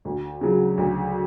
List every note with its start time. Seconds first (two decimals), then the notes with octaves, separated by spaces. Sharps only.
0.05 D2
0.41 C#3 F#3
0.78 D2